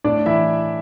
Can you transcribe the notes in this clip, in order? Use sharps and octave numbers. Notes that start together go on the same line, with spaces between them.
A2 D4 D5
E3 E4 E5